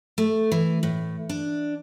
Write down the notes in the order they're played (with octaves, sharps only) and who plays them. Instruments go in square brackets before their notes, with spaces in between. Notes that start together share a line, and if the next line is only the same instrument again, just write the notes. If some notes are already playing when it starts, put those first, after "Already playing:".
[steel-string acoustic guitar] A3
E3
A2
D4